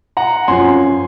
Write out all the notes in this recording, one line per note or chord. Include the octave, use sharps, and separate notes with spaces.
F#5 A#5
F#2 F3 G#5 C6